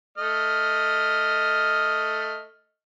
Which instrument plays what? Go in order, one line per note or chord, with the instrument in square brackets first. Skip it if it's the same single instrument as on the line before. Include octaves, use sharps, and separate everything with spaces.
[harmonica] A3 D#5 F6